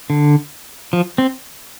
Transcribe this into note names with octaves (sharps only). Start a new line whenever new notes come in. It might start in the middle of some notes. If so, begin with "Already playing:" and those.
D3
F3
C4